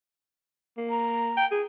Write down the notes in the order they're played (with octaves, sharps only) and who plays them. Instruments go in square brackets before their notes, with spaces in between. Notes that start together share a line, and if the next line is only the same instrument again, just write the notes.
[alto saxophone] A#3
[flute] A#5
[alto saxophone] G5
G#4